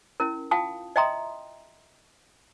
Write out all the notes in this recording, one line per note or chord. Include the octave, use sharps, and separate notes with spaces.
C#4 E4 A#4
F4 F5 G5 A5 D#6
D#5 E5 G5 A#5 C6 D#6